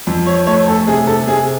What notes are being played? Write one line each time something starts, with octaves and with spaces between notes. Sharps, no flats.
F2
C#5
A3 C#5
A4
C3 G#4
A4
C3 G#4